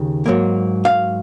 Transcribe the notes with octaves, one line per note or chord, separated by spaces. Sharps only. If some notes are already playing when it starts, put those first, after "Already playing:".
Already playing: D#2 C#3
G#2 F#3 A#3
F5